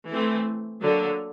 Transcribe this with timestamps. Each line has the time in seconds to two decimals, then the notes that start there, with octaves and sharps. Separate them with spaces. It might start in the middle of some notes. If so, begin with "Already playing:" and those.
0.10 E3 A3 C4
0.79 D3 F#3 A#3